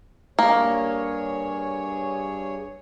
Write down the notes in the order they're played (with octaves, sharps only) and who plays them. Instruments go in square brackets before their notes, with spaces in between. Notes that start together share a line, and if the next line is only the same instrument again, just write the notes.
[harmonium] G2 G#4 C#5 [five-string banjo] A#3